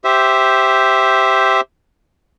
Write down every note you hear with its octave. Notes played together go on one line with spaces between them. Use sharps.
G4 C5 E5